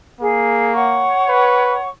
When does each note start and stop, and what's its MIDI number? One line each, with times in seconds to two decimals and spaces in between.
0.20 1.15 58
0.20 0.73 68
0.75 1.88 73
0.75 1.88 78
0.75 1.88 85
1.28 1.77 71